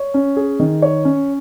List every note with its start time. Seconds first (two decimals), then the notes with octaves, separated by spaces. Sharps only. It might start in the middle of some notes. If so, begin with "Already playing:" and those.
Already playing: C#5
0.14 C#4
0.37 G#4
0.60 D#3
0.82 C#5
1.05 C#4